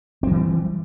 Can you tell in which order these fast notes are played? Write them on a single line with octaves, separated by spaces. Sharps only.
C4 F#3 E3 G3